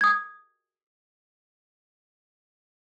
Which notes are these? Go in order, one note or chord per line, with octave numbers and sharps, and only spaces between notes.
D#6 G#6